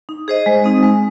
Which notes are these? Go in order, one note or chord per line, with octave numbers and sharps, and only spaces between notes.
D#4
G#4 C5 D#5
G#3
C4 D#4
G#3